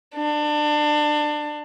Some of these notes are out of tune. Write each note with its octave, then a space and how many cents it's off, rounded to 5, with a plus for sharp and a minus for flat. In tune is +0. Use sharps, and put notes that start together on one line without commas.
D4 +25